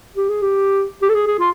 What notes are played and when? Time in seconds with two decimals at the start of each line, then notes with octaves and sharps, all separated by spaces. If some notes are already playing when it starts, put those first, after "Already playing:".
0.15 G4
0.29 G#4
0.42 G4
1.02 G4
1.09 A4
1.14 G#4
1.27 G#4
1.39 F4